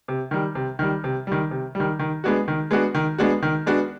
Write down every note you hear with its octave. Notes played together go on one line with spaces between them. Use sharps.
C3
D#3 G3
C3
D#3 G3
C3
D#3 G3
C3
D#3 G3
D#3
G#3 B3 D4 F#4
D#3
G#3 B3 D4 F#4
D#3
G#3 B3 D4 F#4
D#3
G#3 B3 D4 F#4